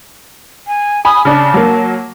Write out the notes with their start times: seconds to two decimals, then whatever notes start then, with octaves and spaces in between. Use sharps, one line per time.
0.67 G#5
1.05 G#5 B5 D#6
1.25 C#3 D4 A5
1.54 F#3 A#3